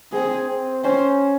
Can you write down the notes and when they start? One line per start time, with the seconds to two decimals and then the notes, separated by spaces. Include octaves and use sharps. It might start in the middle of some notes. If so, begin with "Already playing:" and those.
0.13 C4 G#4
0.49 C4
0.84 C#4 C5